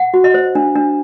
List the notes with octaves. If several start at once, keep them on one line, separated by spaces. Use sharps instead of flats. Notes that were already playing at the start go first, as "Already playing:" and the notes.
Already playing: F#5
F#4
D#5
C5
D4
D4